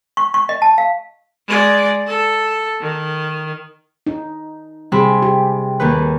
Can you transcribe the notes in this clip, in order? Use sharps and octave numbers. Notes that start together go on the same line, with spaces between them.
C#6
C#6
D#5
A5
F5
G#3 D5
A4
D#3
D#4
C3 G3 G#4 B5
G4
D#2 D#3 B4